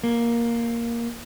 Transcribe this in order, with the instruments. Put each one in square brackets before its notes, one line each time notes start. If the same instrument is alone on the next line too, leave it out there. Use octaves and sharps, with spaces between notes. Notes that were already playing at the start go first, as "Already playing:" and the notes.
[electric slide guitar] A#3